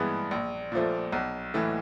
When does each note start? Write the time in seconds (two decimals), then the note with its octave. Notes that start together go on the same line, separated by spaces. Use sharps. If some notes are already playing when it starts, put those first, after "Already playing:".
Already playing: G2 E3 G#3 B3
0.31 A#1
0.72 A#2 F3 A3
1.13 B1
1.54 A2 E3 A3